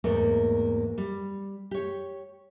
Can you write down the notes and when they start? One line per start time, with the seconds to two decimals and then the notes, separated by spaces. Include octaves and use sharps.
0.04 E2 G#2 A3 A#3
0.98 G3
1.71 G4 C#5